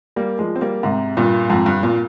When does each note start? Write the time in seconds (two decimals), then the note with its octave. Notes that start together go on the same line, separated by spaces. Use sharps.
0.16 G3 A#3
0.39 F3 G#3
0.56 C4
0.61 G3 A#3
0.83 G#2 C3
1.17 G2 A#2
1.50 F2 G#2
1.66 G2
1.83 A#2